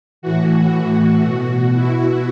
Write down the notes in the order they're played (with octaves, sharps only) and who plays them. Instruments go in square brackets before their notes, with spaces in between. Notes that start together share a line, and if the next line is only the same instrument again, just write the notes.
[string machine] A2 E3 F#4
B2 F#4
E4